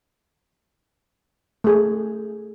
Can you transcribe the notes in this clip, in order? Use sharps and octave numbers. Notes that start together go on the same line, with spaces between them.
A3 G#4